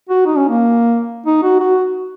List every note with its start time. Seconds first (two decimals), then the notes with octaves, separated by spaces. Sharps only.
0.10 F#4
0.26 D#4
0.37 C#4
0.49 A#3
1.26 D#4
1.43 F#4
1.60 F#4